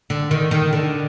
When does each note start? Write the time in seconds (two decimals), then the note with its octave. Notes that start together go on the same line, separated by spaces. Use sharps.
0.10 D3
0.31 D#3
0.51 D#3
0.73 D3